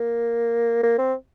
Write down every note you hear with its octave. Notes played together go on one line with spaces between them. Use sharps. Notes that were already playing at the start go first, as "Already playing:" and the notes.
Already playing: A#3
A#3
C4